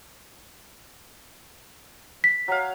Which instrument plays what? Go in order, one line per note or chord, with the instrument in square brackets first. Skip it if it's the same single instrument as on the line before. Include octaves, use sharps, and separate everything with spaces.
[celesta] B6
[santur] F#3 F5